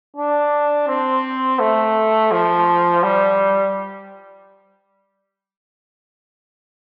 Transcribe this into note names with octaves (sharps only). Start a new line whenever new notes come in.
D4
C4
A3
F3
G3